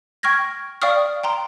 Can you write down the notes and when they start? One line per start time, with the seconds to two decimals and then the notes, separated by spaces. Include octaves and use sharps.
0.23 G5 C#6 F6 G#6 A#6
0.82 D5 F5 G5 C#6 D#6 F6
1.23 G5 A#5 C6